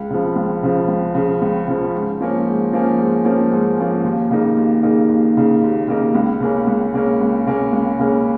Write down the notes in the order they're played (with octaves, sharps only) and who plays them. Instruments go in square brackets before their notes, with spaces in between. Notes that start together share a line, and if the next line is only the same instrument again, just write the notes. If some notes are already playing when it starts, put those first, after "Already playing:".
Already playing: [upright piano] C#2
C#3 F3
C#2
C#3 F3
C#2
C#3 F3
C#2
C#3 F3
G#2
F3 A#3 C#4
G#2
F3 A#3 C#4
G#2
F3 A#3 C#4
G#2
F3 A#3 C#4
D#2
C#3 A#3 D#4
D#2
C#3 A#3 D#4
D#2
C#3 A#3 D#4
D#2
C#3 A#3 D#4
C#2
C#3 A#3 C#4
C#2
C#3 A#3 C#4
C#2
C#3 A#3 C#4
C#2
C#3 A#3 C#4